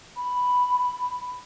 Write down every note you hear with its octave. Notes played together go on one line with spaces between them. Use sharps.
B5